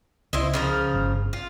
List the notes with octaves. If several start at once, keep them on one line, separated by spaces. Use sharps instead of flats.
C#2 E4 C5 D#5
C#3 F3 A#4
G1
F4